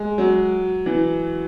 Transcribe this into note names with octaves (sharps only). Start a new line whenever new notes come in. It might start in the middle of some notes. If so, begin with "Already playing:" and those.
Already playing: G#3
F#3
E3